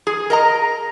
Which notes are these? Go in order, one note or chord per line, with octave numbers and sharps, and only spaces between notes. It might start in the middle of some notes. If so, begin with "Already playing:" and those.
G#4
A#4 D#5 A#5